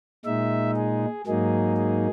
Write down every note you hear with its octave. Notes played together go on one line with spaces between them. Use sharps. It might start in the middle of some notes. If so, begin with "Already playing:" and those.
A#2 G#3 D#4 E5
G#4
G#2 F#3 A#3 D#4 G#4
G#4